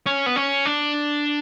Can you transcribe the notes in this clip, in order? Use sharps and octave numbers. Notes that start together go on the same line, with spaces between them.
C#4
B3
C#4
D4